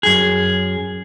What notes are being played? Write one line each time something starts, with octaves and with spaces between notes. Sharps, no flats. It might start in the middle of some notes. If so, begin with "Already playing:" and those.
F#2 G#4